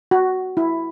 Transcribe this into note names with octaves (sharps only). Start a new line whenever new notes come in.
F#4
E4